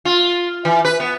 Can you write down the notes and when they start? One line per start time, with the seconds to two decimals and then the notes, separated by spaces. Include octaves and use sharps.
0.05 F4
0.65 E3
0.85 B4
1.00 B3